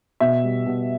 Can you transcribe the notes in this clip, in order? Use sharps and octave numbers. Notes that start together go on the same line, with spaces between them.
B2 E5
G3
B2